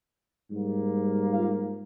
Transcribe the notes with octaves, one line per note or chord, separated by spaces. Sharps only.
G#2 G3 A#3
F4 F5